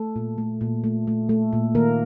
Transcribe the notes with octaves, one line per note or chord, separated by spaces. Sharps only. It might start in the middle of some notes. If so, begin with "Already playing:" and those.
Already playing: A3 A4
A#2
A3
A#2
A3
A3
A3
A#2
D#3 A#3 A#4